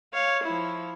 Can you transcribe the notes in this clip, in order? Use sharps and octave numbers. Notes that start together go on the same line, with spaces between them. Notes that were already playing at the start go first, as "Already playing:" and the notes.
C#5 F5
F3 E4